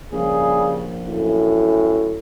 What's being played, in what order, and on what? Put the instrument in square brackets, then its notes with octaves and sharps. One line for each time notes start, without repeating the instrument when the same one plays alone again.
[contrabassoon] A#1 [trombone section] C#3 G3 G#4
[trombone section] F#2 A2